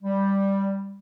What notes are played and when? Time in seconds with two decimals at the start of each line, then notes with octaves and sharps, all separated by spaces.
0.03 G3